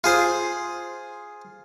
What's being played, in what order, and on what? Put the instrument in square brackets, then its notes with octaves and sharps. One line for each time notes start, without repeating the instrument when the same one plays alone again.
[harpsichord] F4 G#4 C5